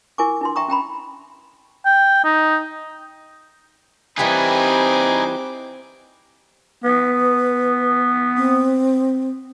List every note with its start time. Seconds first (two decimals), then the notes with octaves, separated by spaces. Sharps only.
0.18 E4 A#4 G#5 C#6 D6
0.41 D4 E4 C6
0.56 E5 G5 A#5 C#6 D#6
0.68 C#4 G5 A#5 B5
1.85 G5
2.24 D#4
4.18 E3 G3 A#3 C4 D#4 B4 G#5 D6
6.84 B3 B4
8.37 C4